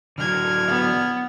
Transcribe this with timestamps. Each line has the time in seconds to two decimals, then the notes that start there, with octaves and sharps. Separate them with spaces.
0.18 D3 F#3 F6 G#6
0.68 B3